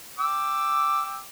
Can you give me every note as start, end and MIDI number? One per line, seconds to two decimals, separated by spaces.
0.19 1.25 79
0.19 1.25 86
0.19 1.25 88